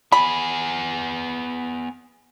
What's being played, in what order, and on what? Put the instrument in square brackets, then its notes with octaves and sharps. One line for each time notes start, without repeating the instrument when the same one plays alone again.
[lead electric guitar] B3 G#4 [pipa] B5